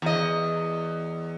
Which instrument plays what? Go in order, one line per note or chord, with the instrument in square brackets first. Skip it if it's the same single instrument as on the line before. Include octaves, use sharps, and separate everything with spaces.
[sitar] E2 D#5